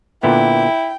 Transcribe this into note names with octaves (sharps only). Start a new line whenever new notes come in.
A#2 D3 B3 E4 G5